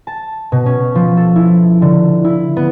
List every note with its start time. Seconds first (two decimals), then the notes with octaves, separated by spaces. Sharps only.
0.07 A5
0.52 B2
0.66 C#4
0.95 F3
1.17 A4
1.36 E4
1.82 D3
2.25 E4
2.57 B3